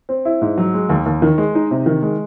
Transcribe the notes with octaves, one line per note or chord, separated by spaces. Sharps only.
C4
E4
G#2
F#3
G#3
D#2
D#2
D#3
G#3
D#4
C3
D#3
G#3